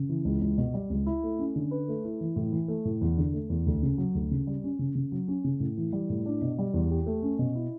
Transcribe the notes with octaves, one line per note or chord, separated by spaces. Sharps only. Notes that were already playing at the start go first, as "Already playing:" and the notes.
Already playing: C#3
E3
C#2
C#2
B2
G3
C#2
E4
A3
C#4
D3
B4
A3
E4
E3
A2
E3
A3
A2
E2
D3
A3
E2
D2
C#3
F#3
D2
C#3
G3
C#4
C#3
C#3
F#3
C#4
C#3
A2
E3
G3
A2
D4
B2
G3
E2
G4
A3
C#4
B2
E4